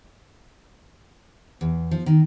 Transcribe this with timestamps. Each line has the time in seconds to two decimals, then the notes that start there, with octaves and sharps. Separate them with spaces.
1.61 E2
1.91 F3
2.06 D#3